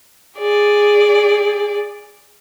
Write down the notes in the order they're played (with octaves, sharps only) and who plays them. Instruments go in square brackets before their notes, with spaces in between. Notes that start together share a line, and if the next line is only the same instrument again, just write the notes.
[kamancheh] G#4 D5